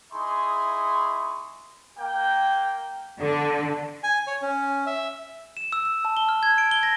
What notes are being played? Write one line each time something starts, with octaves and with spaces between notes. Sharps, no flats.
D#4 E4 G#4 C6 C#6
A#3 G5
D3
G#5
C#5
C#4
E5
E7
E6
E6
A5
G7
F6
G#6
D7
G7
A#6